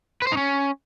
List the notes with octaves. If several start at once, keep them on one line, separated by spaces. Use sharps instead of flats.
B4
C5
D#4
C#4